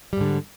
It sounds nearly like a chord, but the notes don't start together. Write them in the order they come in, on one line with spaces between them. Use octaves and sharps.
G3 G#2 D3